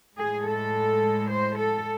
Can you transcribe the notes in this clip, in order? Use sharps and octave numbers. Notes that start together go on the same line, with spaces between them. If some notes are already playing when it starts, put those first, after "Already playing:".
A2 G#3 G#4
A4
C5
A4